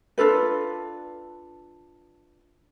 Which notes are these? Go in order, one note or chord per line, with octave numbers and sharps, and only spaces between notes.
D4 F4 A4 B4